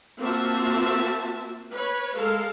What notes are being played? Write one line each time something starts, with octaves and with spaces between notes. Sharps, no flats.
A#3 C4 F4 F#4 E5 A5
B4 C#5
G#3 A4 A#4 F5